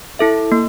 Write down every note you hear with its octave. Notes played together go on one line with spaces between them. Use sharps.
E4 A4 E5
A#3